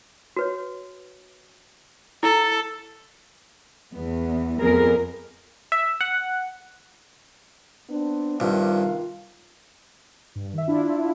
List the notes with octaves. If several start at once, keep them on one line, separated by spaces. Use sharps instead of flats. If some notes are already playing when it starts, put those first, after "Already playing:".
F#4 B4 C#5
E4 A4
E2 B3
F2 B3 G#4 A#4
E5
F#5
B3 C4 D4
C2 G2 D#3 F4
G2
D#3 E5
D4 E4 F4